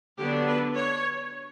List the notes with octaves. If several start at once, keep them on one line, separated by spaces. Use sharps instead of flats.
D3 F#3 B3 D4 G4
B4
C#5